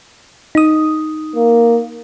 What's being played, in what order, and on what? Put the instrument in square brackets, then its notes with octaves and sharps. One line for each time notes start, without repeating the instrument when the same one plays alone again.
[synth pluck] D#4 D#6
[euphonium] A#3